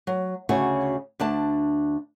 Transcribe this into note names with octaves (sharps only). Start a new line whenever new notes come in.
F#3
D2 C#3 F#4 C#5 G#5
D2 D4 A5